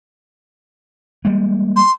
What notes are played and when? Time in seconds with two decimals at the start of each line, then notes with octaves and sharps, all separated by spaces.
1.25 G3 G#3 A#3
1.76 C6